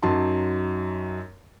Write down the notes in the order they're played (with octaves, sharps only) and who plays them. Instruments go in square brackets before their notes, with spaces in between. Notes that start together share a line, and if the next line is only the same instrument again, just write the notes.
[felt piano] F#2 F#3 D#4 A5 C6